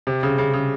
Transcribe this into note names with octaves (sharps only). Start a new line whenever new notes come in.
C3
C#3
C#3
C#3